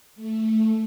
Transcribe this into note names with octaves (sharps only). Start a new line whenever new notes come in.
A3